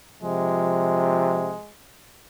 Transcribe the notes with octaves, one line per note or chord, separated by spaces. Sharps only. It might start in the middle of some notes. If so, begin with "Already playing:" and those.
C3 F3 G#3